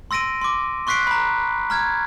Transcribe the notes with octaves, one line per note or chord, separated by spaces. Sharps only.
C6 E6 A#6 D7 D#7
C6 D6
C6 C#6 F#6 B6 C7 D7
A#5 B5
A#5 F6 G#6